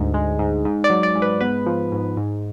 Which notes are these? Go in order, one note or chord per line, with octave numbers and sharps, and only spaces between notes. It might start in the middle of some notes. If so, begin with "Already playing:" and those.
Already playing: D2 G#2
G#3
G#2
G#2
D5
F#3
D5
G#2
B4
B3 B4
F3
G#2
G#2